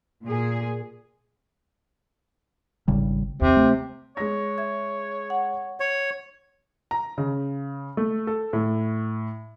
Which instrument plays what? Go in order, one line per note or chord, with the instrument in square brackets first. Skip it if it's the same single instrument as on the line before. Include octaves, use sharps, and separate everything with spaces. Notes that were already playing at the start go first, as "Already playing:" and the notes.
[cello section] A#2 G#4
[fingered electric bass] G#1 C#3 G3
[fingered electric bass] D#2 [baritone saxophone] C3
[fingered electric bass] A3
[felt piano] G#3 A#6 [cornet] C#5
[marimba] E5 G#6
F#5
[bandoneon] C#5
[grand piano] A#5
C#3
A3
A4
A2